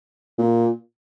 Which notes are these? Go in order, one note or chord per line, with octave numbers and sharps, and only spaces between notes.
A#2